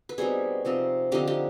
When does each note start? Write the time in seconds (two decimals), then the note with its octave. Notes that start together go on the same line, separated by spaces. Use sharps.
0.09 B4
0.18 B2 G3 C4 D#4 G#4
0.65 C3 F3 C4 D#4
1.12 D3 F3 C4 D#4 G4
1.28 G4